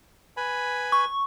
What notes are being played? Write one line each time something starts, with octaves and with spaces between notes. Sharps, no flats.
B4 G#5 B5
C#6